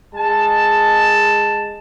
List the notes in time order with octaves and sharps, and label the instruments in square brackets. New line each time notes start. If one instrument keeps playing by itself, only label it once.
[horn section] G#3 A5